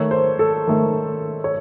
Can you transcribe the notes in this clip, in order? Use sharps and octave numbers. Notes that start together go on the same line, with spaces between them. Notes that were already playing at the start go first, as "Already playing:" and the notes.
Already playing: D#3 A3 C#5
C5
A4
D#3 A3
C#5